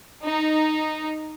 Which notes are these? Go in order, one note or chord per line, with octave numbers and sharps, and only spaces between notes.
D#4